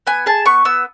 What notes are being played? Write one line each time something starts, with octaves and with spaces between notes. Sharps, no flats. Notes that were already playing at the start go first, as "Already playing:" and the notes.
B3 G#5
G#4 A5
B3 C#6
B3 E6